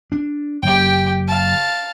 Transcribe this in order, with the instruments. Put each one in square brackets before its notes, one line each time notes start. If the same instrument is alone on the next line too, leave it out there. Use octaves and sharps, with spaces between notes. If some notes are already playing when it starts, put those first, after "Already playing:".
[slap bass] D4
[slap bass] F#1 [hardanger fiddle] G4 G5
[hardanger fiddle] F5 A5